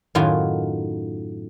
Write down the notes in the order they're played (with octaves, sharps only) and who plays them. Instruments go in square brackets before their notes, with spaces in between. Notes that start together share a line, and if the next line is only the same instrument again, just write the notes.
[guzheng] F#2 A2 D#3 F4 F#4 G#5